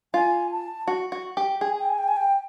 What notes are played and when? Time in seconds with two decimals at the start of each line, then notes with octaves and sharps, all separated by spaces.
0.14 F4 G#5
0.51 A5
0.88 F#4
1.12 F#4
1.37 G4
1.61 G#4 G5
1.70 G#5
1.79 G5
1.89 G#5
1.98 G5
2.08 G#5
2.17 G5